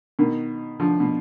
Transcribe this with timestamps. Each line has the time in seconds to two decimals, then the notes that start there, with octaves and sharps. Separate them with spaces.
0.19 B2 D#3
0.80 D3 F3
1.00 B2